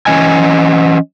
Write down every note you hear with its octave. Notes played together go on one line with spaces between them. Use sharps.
E3 C#4 D#5 G#5